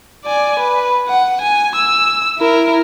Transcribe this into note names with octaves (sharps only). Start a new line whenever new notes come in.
D5 G#5
B4
F#5
G#5
E6
E4 A#4